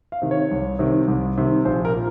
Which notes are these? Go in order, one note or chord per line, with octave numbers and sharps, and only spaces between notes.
F5
C3 D#3
C#5
C2
C3 D#3
C2
C3 D#3
A#1 C5
A#4
A#2